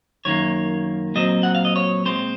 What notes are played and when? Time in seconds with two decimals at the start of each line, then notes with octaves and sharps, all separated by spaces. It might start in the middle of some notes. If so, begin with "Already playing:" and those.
0.25 F#2 D#3 A#3 C#5
1.15 A#2 F#3 C4 D#5
1.43 F#5
1.55 F5
1.65 D#5
1.76 C#5
2.05 A#2 G#3 C4 C5